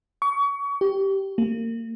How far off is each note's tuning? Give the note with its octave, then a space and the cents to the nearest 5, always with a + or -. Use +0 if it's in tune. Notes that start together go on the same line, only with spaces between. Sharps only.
C#6 +30
G4 -10
A#3 -30